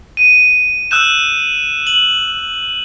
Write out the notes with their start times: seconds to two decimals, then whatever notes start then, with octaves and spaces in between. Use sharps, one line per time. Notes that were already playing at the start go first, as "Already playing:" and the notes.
0.17 D#7
0.91 E6 F#6 G6 E7
1.87 F#7